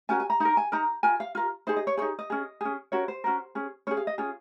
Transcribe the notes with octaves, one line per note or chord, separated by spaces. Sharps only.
C#4 F#4 A#4 G#5
G#5
A#5
D#4 A#4 A#5
G#5
D#4 A#4 A#5
F4 A#4 G#5
F5
F4 A#4
D#4 G#4 C5
D#5
C#5
D#4 G#4 C#5
D#5
C#4 G#4
C#4 G#4
C#4 F#4 A#4 C#5
C5
C#4 F#4 A#4
C#4 G#4
C#4 G#4 C#5
F5
D#5
C#4 F4 G#4